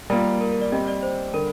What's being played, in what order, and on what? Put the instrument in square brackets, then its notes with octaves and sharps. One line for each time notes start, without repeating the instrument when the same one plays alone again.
[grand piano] G3 A#3 F4 [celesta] A#4
[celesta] A#4
A#4
D5
[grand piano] G3 C4 G4 [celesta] D#5
[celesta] D5
C5
[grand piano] D3 G3 [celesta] A#4